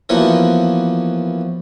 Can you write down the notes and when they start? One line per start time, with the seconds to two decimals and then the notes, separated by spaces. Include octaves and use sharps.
0.09 E3 F3 A#3 B3 F#4 C#5